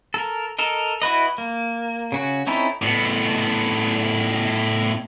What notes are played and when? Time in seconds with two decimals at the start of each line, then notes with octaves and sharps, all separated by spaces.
0.14 A4 A#4
0.58 A4 A#4 D#5
1.02 E4 F#4 B4 D#5
1.38 A#3
2.12 C#3 C#4 F#4
2.47 C4 C#4 D#4 E4 A4
2.82 A2 B3